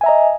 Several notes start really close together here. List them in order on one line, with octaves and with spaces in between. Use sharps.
G#5 E5 A#5 D#5